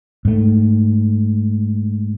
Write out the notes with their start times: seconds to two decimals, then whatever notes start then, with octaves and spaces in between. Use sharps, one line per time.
0.25 G#2 A3